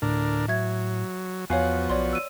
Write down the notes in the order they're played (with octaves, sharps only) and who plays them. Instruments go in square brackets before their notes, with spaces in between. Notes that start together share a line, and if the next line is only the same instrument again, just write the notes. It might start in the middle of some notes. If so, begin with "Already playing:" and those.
[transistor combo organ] D2 D4 A#4 [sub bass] A2
[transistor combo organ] F#3 [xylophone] E5 G#6
[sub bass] E2 [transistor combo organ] F3 B3 F#4 [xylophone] C#5 F5 G#5
[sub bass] B1 [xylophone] C#5 D5 C6
[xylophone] E6 D#7